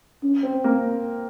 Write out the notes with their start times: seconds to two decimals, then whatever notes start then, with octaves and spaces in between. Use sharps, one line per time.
0.23 C#4
0.43 C4
0.64 A#3 C4